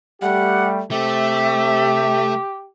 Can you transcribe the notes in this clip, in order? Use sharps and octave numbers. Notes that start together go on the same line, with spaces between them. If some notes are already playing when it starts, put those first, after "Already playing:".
G3 A3 G4 F#5
C3 A3 G4 E5